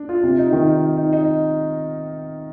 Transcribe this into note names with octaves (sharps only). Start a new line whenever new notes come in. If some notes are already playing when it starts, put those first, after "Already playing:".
Already playing: D4
F4
C3
D#4
D#3
D#4
D#4
D#4
D#4